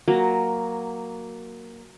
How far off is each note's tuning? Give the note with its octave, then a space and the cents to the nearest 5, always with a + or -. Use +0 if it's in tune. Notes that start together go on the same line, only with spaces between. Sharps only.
F#3 +0 A#3 +0